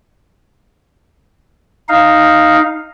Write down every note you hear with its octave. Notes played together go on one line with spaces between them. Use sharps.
D#4 F5